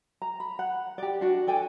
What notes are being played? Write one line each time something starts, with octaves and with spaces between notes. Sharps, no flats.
A#5
B5
F#5
G4 D5
D4 F#4
A4 D5 G5 G#5